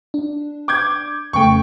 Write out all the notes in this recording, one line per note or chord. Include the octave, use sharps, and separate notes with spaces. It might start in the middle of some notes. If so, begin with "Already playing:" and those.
D4
D6 G6 G#6
F2 C#3 A3 G5 C#6